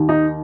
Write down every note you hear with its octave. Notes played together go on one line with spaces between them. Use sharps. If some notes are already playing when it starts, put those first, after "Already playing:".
Already playing: D#2 D#3
D#4